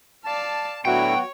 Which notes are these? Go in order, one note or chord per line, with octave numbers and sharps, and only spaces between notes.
D5 F5 A5
A2 D3 F#3 B3 E4 F#4 C#5 G5